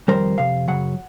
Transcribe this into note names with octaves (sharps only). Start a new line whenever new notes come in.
F2 C3 D#3 G3 A#4 C5
F2 C3 F5
F#2 C#3 F#3 F#5